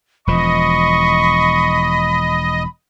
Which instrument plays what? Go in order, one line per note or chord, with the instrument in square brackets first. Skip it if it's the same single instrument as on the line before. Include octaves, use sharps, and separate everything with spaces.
[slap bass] E1 F3 [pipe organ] D#5 [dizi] B5 [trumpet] C#6